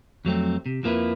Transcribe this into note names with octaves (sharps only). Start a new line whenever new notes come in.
F2 F#3 A3 C4
C3
F2 F3 A#3 D4 E4 B4